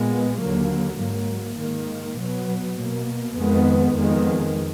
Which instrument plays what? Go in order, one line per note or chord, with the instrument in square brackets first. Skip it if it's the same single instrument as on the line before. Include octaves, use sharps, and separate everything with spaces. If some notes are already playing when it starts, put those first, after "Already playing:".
Already playing: [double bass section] A#2 G#3 B3
D#2 D3 F#3 A#3
G#2 F#3 A#3
G#2 D#3 A#3
B2 F#3 B3
B2 A#3
F2 D#3 G#3 B3
F2 D#3 G#3 B3